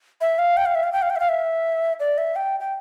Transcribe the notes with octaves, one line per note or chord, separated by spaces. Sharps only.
E5
F5
G5
F5
E5
F5
G5
F5
G5
E5
F5
E5
D5
E5
G5
G5